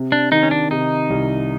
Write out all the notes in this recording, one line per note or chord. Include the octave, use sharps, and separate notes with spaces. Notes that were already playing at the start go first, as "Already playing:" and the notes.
Already playing: C3
D4
D#3 D#4
C#4
D4
C3 D#4
C2